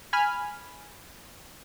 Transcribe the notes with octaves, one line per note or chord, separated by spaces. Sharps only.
G#5 B5 F6